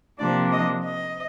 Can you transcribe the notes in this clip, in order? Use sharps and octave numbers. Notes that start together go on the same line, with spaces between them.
C3 F3 A#3 D4 D5
D#5
D#5